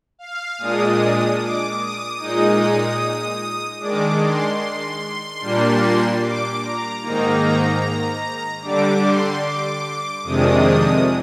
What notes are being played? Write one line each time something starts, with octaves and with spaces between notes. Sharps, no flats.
F5
A#2 G#3 D4 D#6
D6
D#6
A#2 G#3 D#4
D#3 G#3 D4 D6
C6
A#2 G3 A#3 D4
D6
A#5
G#2 D#3 A#3 D#4 A#5
D3 G3 D4 D6
C6
D6
F2 C3 D#3 G#3 D4 D#6